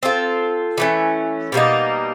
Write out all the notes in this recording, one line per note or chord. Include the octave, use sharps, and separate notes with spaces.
C4 F4 A4
E3 A3 C#4
B2 G3 A#3 D#4